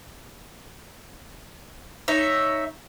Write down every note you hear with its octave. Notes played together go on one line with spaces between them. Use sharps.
D#4 C#5 E5